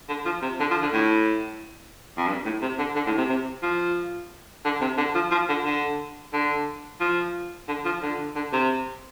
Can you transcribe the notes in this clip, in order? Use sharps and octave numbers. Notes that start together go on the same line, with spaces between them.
D3
F3
C3
D3
F3
D3
A2
F2
G2
A2
C3
D3
D3
A2
C3
C3
F3
D3
C3
D3
F3
F3
D3
D3
D3
F3
D3
F3
D3
D3
C3